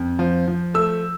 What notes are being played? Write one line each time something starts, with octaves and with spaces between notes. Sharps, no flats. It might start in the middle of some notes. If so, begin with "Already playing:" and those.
Already playing: F2
F3
F3
A3 E6